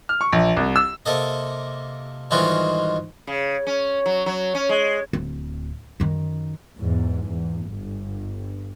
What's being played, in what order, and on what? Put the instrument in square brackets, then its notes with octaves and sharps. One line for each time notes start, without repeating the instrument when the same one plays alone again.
[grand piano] F6
C#6
A#1
C2
E6
[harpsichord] C3 A#3 A4 D#5
G#2 D#3 E3 G3 F4 F#4
[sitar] C#3
C#4
F#3
F#3
C#4
G#3
[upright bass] D1
F#2 D#3
[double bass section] E2 G#2
E2
G1